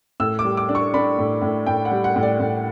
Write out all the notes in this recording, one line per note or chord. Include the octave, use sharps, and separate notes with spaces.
A2 E6
D6
G3
D6
D4
C#6
D4 B5
A2
A2
A2 G5
F#5
G3
F#5
A2
D5
A2